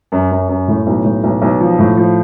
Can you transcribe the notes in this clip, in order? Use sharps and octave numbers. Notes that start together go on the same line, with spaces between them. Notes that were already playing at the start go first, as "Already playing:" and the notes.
F#2
F#2
F#2
A2
B1
A2
B1
B1
F3
A2
F3